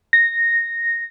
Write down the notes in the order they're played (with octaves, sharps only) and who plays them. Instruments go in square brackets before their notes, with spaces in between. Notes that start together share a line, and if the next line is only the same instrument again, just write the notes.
[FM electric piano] A#6